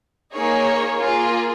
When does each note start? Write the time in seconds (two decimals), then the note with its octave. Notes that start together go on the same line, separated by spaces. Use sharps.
0.33 A#3 D#4 G#4 C#5
0.99 A#3 F4 G#4